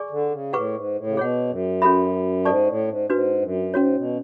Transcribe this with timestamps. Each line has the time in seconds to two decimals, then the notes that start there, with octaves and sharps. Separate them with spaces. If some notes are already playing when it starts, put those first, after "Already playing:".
Already playing: G#4 D5 G#5 C#6
0.10 D3
0.31 C#3
0.53 A2 G#4 B4 F#5 C#6
0.74 G#2
0.96 A2
1.07 C#3
1.17 B2 G#4 C#5 F#5
1.49 F#2
1.82 C#4 F#4 A4 E5 B5
2.45 G#2 A4 D5 A5 C#6
2.67 A2
2.88 G#2
3.10 G#2 D4 F#4 B4
3.42 F#2
3.73 G#2 C#4 F#4 C#5
3.95 B2